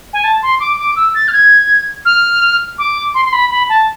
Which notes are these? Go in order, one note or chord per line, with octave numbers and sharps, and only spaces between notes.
G#5
A5
C6
D6
D6
E6
A6
F6
G#6
F6
D6
C6
C6
B5
B5
A5